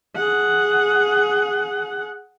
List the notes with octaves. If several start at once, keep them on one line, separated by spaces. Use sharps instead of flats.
G#4 F#5